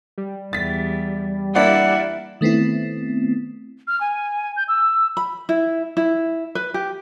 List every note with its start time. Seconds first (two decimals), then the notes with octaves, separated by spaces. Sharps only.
0.18 G3
0.53 E2 A6 B6
1.55 A#3 D4 E4 D5 F#5
2.41 D#3 A3 B3 C4 E4
3.88 F6
4.01 G#5
4.57 G6
4.68 E6
5.17 B5
5.49 E4
5.97 E4
6.55 B4
6.74 G4